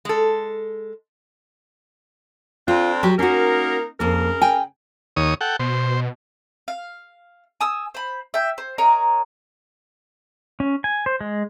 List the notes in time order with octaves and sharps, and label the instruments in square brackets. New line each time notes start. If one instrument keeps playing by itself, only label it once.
[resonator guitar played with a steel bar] G#3 A4
[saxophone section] F2 C4 D4 [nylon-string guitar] F4
[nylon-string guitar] F#3 G4
[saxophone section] A#3 D#4 A#4 [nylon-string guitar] C#4 F#4
[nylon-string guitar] F2 A#3 [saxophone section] C#3 A#4
[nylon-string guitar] G5 G#5
[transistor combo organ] D#2 C#5 D#6
A4 F#5 G5
[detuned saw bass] B2 [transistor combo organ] C5
[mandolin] F5
G#5 D#6 E6
C5 B5
E5 G5
C5
A#4 C#5 D#5 A#5
[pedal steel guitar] C#4
G#5
C5
G#3